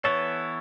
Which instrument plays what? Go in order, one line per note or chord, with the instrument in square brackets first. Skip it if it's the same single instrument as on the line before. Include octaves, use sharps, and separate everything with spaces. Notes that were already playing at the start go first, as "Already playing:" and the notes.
[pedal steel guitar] E3 B3 E4 A4 [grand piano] C#5